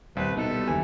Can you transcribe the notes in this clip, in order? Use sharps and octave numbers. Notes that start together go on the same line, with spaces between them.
D#1 C2 G3 C4 B4
B2 D#4 A4
G3
F#1 D#2 D3 E3